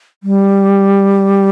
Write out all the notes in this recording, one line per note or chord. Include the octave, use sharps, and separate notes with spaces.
G3